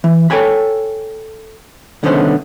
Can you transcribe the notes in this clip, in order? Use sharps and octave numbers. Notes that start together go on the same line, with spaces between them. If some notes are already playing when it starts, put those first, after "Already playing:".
E3
A4 C#5 G5 G#5 B5
C2 D3 D#3 B3 C#4 C5